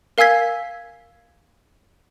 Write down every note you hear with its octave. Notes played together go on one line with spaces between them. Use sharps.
A#4 F5 G#5 E6 G#6 B6